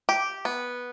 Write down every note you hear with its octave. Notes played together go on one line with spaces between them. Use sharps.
G4
B3